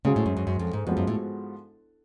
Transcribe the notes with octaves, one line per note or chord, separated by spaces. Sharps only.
G#2 C#3 F#3 C#4 G#4
A2
F#2
F#2
F#2
F2
G#2
F2 G#2 F3 G#3 B3 F#4
F#2
A2